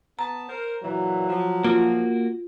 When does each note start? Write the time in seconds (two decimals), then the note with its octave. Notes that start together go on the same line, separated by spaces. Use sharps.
0.19 B3 A5 A#5
0.49 A#4 C5
0.83 A#2 E3 F#3
1.29 F3
1.64 A#3 F4 F#4